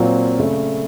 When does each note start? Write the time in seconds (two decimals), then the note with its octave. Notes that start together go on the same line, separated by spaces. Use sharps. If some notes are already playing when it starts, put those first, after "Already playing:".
Already playing: A#2 F#3 C4 F4
0.39 C#3 A3